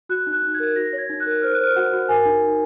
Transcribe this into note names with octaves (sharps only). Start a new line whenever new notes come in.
F#4 F#6
D#4
F#6
D#4
G#6
A#4
F#4 A#6
C#5
G#6
D#4
F#6
A#4
C5 F6
F#6
C5 F6
F#4 F#5
F#4
A#4 G#5
D#4
D#4